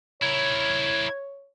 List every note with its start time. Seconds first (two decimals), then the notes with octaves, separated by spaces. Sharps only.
0.22 E4 A#4 C#5 G#6